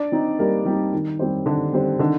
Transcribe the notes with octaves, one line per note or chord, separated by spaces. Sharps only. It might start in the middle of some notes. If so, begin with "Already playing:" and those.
Already playing: D4 D5
C4 D#4
G3 A#3 A#4
G3 C4 D#4 G4
D#3
G3 C4 G4 C5
D3 D#3 D4
G3 C4 G4 C5
D3 D#3 D4